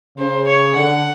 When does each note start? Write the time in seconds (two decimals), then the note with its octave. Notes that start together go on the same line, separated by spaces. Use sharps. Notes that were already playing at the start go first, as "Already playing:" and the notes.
0.18 C#3 C5
0.47 C#5
0.75 D3 F#5